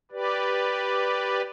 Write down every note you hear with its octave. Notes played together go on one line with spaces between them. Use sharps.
G4 B4 D5